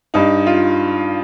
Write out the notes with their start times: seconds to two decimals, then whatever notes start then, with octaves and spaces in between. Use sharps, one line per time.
0.14 G2 D#4
0.46 F4